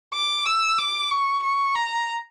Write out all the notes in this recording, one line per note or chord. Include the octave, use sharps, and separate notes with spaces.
D6
E6
D6
C#6
C#6
A#5